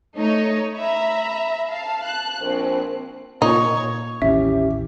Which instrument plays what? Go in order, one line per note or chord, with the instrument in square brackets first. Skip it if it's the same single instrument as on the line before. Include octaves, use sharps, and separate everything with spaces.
[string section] A3 D#4 C#5
E5 A#5 B5
F5 A5
A5 F#6
A#1 C4
[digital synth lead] A#2 [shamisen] D#4 [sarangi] C#5
[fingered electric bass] A1 D#2 E3 [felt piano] C#4 [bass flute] G4 [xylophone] E5